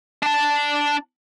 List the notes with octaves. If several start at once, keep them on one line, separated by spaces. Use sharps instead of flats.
D4 A5